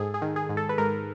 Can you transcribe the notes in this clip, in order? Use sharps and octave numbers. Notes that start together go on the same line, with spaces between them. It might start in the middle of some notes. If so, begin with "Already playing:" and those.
Already playing: G#2 G#4 A4
G#4
D#3
G#4
G#2
A4
B4
G#2 A#4